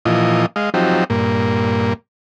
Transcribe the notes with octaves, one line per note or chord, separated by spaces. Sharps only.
A#2 E3 F3 D#5
G#3 D#5 F5
F3 F#3 C4 D#4 G4
G2 A#2 A#3